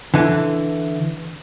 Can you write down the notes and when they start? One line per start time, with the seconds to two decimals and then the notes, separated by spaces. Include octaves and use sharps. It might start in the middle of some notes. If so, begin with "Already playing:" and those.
0.14 D3 E3